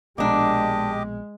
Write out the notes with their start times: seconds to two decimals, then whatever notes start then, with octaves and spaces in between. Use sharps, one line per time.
0.18 A#1 B2 G#3 A#3 D4 G4 D#5 D6